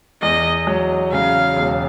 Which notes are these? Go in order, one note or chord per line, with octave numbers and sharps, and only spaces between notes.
E2 D#5
F#3
C#3 F5
E1